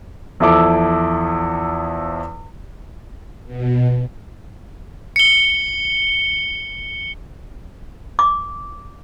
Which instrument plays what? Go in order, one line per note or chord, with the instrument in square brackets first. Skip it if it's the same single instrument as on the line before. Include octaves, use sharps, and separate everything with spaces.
[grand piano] E2 F3 E4 A4 D6
[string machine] B2
[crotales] C#7 G7
[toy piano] D6